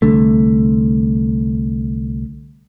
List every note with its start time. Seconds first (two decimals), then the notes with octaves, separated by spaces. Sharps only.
0.02 C2 D3 A3